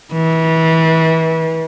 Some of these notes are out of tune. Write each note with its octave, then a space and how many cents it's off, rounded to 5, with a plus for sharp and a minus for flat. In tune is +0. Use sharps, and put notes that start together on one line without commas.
E3 -30